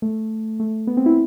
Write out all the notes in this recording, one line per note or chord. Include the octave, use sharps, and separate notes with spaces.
A3
A3
B3
C4
E4